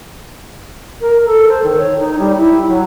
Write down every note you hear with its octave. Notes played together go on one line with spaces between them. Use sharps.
A#4
A4
C5
D#3
C#5
D#4
G3
E4
F#3